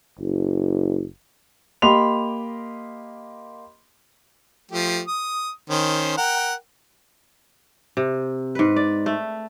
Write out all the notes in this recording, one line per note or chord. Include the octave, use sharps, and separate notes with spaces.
F#1
A#3 G4 D#5 B5 C6 F7
F3 A3 G4
D#6
D#3 C#4 C5
A#4 F#5 G5
C3
G#2 B4
D5
A3